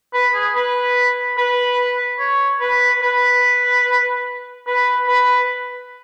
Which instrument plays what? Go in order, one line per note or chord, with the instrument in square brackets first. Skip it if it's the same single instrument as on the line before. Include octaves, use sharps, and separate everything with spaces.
[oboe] B4
G#4
B4
B4
C#5
B4
B4
B4
B4